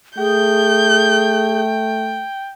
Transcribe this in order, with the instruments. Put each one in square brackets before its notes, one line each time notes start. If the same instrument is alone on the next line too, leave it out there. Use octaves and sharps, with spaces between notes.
[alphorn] A3 [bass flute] G#4 [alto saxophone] G5 [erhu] G6